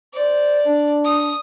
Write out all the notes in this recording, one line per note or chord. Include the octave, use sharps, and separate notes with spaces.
C5 D5
D4
D#6